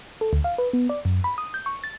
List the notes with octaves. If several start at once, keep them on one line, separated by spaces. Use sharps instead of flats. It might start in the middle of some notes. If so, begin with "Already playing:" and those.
A4
D2
F5
B4
B3
D5
F#2
B5
D#6
G6
C#6
A6